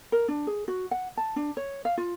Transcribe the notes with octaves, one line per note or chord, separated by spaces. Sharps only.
A#4
D4
G#4
F#4
F#5
A5
D4
C#5
F5
F4